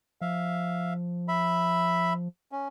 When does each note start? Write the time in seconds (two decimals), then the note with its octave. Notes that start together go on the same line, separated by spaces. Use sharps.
0.21 F3 E5 F5
1.28 E5 B5
2.52 C#4